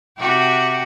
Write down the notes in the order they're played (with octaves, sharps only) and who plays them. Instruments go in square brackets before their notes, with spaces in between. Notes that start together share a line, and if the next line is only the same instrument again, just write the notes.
[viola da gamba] C3 F#4 G4